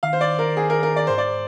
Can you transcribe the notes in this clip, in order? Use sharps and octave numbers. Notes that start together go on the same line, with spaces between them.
D#3 F5
C5
D5
A#4
G#4
A#4
A#4
D5
G#2 C5
D5